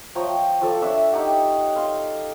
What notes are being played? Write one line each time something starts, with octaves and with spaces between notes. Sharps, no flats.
F3 C#5 G5 A#5
F3 A4 D5
D4 C#5 E5
D#4 G4 F#5
F5 C6